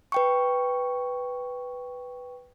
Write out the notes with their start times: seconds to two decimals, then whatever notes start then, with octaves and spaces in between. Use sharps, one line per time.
0.12 B4 G5 C#6